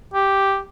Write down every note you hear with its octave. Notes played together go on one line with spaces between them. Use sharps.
G4